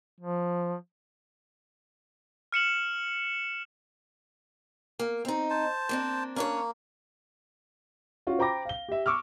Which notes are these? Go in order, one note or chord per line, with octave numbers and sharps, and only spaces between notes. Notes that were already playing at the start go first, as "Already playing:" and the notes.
F3
F6 C#7 E7 F#7
A#3
C4 D#4
C5 A5
A#3 C4 D4
A#3 C#4 D4 C#5
C#4 F4 F#4
C5 G5 A#5 B5 D6 A#6
F5 G7
G4 E5
C#6 D6 E6 F6